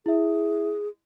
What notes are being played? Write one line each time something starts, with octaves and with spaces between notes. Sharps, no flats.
E4 G#4 E5